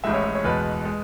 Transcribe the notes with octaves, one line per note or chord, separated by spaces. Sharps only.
A1 A2 G#3 E5
C#5
C#5
C#5
E2 B2 G#3 B4
G#3